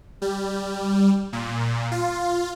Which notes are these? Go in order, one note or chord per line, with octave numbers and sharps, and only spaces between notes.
G3
A#2
F4